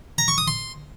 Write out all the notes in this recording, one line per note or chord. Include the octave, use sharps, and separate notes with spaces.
A#5
C#6
D#6
C6